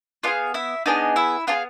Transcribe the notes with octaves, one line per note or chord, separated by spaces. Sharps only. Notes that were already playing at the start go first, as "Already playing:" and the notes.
B3 D4 F4 G#4 F5
E4 E5
B3 D4 D#4 G#4 D#5
E4 E5
B3 D4 F4 G#4 F5